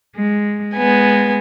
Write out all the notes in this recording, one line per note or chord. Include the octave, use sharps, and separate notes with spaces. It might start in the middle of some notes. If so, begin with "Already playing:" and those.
G#3
G#3 B3 G#5